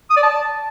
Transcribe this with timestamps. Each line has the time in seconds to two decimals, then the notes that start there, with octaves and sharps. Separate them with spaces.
0.10 D#6
0.17 D5
0.23 A5